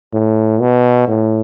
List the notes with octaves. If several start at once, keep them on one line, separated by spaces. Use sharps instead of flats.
A2
B2
A2